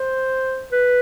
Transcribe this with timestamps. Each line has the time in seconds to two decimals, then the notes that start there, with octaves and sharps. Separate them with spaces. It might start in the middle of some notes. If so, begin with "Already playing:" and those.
Already playing: C5
0.72 B4